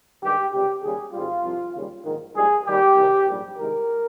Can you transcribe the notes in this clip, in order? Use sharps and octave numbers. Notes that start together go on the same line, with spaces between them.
G2 D#3 G#3 G4
C#2 C3 G3 G4
D#2 C#3 G3 G#4
G#1 G#2 G3 F4
C2 C3 F3
D#2 C#3 G3
A#1 G#2 D#3
A#1 G#2 G3 G#4
D#2 D#3 G3 G4
C2 C3 D#3
A#1 G#2 G3
C2 C3 D#3 G#3 A#4